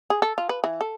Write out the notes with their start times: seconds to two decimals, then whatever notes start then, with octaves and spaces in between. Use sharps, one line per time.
0.10 G#4
0.22 A4
0.38 F4
0.49 B4
0.64 E3
0.81 A4